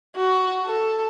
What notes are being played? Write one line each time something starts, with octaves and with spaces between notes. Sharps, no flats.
F#4
A4